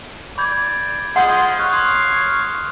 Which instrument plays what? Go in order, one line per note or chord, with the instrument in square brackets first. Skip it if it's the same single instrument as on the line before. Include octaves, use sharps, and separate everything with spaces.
[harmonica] D5 [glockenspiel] B5 G6 G#6
[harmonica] F3 G#3 [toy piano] F#5 [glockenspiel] C6 D#6 G6
[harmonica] C#5 F5 [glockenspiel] F#6
[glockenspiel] C6 D#6